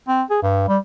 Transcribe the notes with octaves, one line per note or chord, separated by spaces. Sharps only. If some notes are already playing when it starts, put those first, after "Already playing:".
C4
G#4
G2
G3